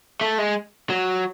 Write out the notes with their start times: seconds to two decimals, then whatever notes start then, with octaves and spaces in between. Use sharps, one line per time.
0.21 A3
0.38 G#3
0.90 F#3